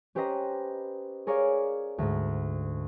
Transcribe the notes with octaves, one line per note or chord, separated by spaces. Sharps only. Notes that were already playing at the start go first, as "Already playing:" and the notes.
C#4 G4 B4 C5 D#5 A#5
G#4 A#4 C#5 D5 F5
D2 G#2